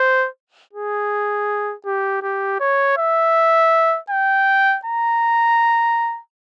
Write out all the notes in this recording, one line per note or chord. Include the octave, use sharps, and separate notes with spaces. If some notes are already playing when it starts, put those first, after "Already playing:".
Already playing: C5
G#4
G4
G4
C#5
E5
G5
A#5